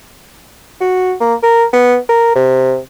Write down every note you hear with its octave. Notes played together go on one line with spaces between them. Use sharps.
F#4
A#3
A#4
B3
A#4
C3